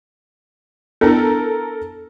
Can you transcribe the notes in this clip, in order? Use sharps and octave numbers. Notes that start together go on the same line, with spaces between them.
B3 D4 E4 A4 A#4